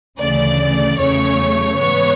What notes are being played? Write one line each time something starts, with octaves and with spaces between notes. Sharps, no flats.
D2 C#3 E3 A3 D5
E2 C#3 F#3 A3 C#5
G#2 E3 B3 C#5